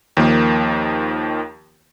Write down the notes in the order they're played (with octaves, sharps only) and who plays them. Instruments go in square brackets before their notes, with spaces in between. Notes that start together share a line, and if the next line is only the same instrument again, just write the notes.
[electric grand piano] D#2 D#3 F3 A#3